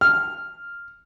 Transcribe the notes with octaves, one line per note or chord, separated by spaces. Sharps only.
F6